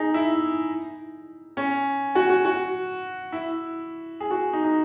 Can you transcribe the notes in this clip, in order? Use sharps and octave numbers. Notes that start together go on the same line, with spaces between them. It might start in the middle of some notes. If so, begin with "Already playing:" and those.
Already playing: D#4 G#4
E4
C#4
F#4
F#4
F#4
E4
G#4
F#4
D#4
D#4